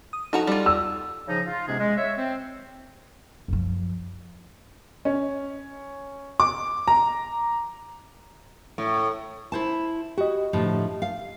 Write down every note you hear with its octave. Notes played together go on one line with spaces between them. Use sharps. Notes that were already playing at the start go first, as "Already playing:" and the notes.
D#6
F3 D#4 F#4 A4 F#5 A#5
G3 F4
E6
C#3 F3 D#4
F4
G#2 C3 G#3 B3 C#4 G#4
G#3
C#5 E5
C4
F#2 F3
C#4
D6
A#5
A2
E4 C5 A5
F#4 G4 D#5
A2 D3 F3
F5